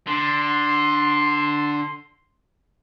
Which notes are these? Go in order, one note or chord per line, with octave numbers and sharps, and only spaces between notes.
D3 C6